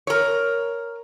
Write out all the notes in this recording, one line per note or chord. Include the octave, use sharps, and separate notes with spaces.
A#4 C#5